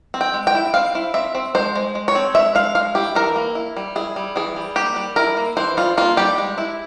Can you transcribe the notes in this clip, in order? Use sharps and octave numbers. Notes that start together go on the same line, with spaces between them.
C4
G5
G#3
G5
E4
C4 F5
E4
C4 E5
C4
G#3 C5
G#3
G#3
C#5
C4
G#3 E5
G#3 F5
G#3 F5
E4 G4
E3 A#4
A#3
E4
G3
E4 G#4
G3
E3 G#4
G3
A#3 G4
G3
E4 A#4
A#3
E3 C5
G3 F4
A#3 F4
G3 G4
G#3
E4